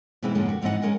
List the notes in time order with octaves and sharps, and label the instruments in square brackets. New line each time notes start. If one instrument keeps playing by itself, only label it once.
[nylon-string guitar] B2 E3 G#3 C4 E4
F2 G#2 D3 G#3 A#3 C#4
F#4 G4
G#2 E3 F3 C4 D#5 F#5
G#3 C#4 A#4 D#5 F#5